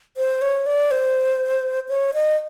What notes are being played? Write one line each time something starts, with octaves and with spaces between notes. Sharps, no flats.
C5
C#5
D5
C5
C#5
D#5